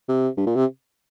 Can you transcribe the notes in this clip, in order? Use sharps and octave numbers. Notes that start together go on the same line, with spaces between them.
C3
G2
A#2
C3